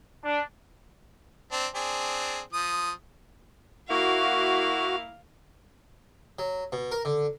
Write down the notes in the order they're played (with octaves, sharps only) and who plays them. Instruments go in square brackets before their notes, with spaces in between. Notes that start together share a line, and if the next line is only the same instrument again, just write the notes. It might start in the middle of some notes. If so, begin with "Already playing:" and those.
[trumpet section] D4
[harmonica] C4 D4
C4 D4 G#4
F3 D#6
[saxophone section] A#3 E4 [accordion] F#4 [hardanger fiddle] F5
[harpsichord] F#3
B2
A#4
D3